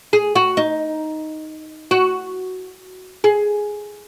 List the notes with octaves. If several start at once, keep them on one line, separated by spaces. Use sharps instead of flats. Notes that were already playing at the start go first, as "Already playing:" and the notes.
G#4
F#4
D#4
F#4
G#4